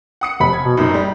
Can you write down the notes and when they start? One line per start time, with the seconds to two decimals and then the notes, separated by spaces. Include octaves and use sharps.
0.21 F#5 D#6 C#7
0.40 F1 B5
0.53 G#6
0.65 B2
0.77 F#2 A#2 D#4 A#5
0.94 G3